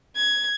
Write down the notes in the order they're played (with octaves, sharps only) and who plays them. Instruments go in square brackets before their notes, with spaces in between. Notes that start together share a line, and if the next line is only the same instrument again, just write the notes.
[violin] G#6